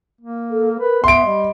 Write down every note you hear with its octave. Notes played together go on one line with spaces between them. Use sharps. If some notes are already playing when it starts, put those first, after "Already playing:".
A#3
A4
A#4 B4
B3 E5 C6 D7
G3 D#5